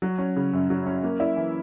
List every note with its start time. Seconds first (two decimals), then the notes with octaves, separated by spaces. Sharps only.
0.02 F#3
0.18 C#4
0.36 C#3
0.53 F#2
0.70 F#3
0.86 C#4
1.04 A#3
1.20 E4
1.36 E3